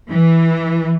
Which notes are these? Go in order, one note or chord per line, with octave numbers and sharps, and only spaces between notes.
E3